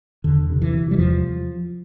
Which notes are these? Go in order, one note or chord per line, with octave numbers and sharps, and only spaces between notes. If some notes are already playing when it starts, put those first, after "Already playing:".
E2 D3
C3
E3
C3
G3
E2 F3